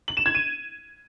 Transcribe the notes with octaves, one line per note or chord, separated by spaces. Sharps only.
F#7
E7
G#6
D#7